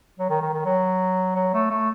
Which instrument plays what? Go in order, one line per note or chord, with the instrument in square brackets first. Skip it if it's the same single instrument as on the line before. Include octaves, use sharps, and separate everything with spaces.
[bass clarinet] F#3
D#3
D#3
D#3
F#3
F#3
A3
A3